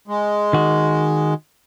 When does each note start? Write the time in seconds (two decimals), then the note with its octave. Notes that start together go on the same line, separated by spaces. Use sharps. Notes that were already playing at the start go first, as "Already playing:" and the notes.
0.08 G#3
0.53 D#3 F#4